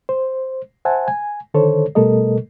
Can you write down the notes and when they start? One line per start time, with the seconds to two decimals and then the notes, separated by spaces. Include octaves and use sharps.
0.09 C5
0.85 C5 E5 F#5 G#5 A5
1.08 G#5
1.54 D3 D#3 A4 C5 C#5
1.95 B2 G3 A3 A4 A#4 D#5